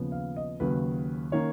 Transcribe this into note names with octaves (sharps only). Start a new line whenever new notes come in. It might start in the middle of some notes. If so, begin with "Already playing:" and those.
Already playing: D#2 C#3 F3 B3
F5
D#5
D#2 C#3 F#3 B4
D#3 A#3 C#4 C#5